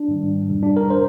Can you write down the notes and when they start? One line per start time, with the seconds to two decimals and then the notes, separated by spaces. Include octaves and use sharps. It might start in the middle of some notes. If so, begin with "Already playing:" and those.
Already playing: D4
0.08 G#2 D#3 G3
0.49 F2 C3 G3
0.63 D4
0.77 A#4
0.90 C3 C5